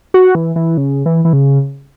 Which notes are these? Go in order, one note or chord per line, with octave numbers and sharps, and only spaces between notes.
F#4
E3
E3
C#3
E3
E3
C#3